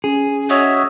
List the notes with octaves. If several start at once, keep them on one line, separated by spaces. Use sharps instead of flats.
C#4 G#4
F#4 C#5 D#5 E5